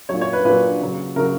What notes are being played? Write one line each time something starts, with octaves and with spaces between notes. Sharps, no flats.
A#2 F#3 C#5
C#5
B4
A#2 F#3 B4
C#3 F#3
C#3 F#3 A#4